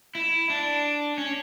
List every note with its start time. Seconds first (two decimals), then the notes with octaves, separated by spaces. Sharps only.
0.15 E4
0.50 D4
1.18 C#4